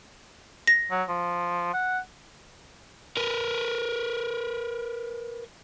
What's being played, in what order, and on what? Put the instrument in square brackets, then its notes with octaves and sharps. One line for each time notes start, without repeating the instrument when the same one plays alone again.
[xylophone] A#6
[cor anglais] F#3
F3
F#5
[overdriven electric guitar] A#4 B4